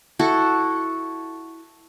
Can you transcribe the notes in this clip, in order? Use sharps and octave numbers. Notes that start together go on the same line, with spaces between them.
E4 F#4 A4